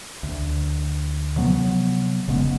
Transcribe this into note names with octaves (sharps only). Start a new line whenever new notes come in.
D2
C3 F3 F#3 B3
F1 C#3 G#3 B3